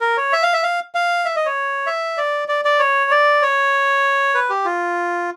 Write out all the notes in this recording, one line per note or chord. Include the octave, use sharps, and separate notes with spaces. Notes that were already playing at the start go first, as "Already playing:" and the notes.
A#4
C#5
E5
F5
E5
F5
F5
E5
D#5
C#5
E5
D5
D5
D5
C#5
D5
C#5
B4
G4
F4